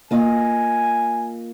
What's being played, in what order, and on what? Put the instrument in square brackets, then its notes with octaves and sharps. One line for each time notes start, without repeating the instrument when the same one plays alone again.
[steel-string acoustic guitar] A#3 F4 D#5 [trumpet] G#5